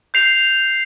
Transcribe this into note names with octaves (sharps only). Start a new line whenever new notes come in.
G6 C7 F7